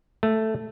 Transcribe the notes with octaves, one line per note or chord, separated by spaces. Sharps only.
A3